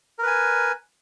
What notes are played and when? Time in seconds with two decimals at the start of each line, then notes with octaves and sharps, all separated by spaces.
0.19 A#4
0.23 B4
0.27 G#5